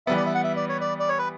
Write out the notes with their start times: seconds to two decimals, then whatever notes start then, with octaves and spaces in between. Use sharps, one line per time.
0.07 E3 G3 B3 E5
0.17 D5
0.26 E5
0.35 F#5
0.44 E5
0.57 D5
0.69 C#5
0.81 D5
1.00 D5
1.09 C#5
1.19 B4